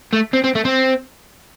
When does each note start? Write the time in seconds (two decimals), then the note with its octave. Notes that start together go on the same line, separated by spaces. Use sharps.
0.13 A3
0.33 C4
0.44 C4
0.55 A3
0.65 C4